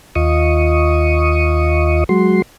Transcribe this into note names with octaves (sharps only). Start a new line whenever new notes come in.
D#2 F4 D#5 C#6 D#6
F#3 G#3 F#4 C6